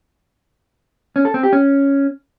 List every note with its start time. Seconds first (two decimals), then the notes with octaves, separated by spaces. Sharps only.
1.16 C#4
1.25 A4
1.34 C4
1.43 G4
1.53 C#4